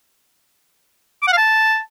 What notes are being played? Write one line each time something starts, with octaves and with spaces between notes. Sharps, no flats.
D6
F#5
F5
A5